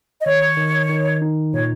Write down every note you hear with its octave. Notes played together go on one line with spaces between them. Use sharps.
D#5
D#3 C#5
D#3
D#3
D#4
A#2 C#5